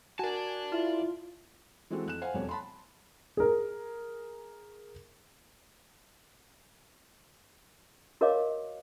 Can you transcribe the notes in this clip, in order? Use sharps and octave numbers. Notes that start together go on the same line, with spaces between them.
F#4 A#4 D5 G#5 A5
E4 F4
E3 G#3 C4 F#4 A4
F2 F#6 E7
C5 F5 F#5 G#5
E1 F2 G3 C#5
A5 B5 C6
G#4 A#4
F#4 A#4 C#5 D#5 F5 D6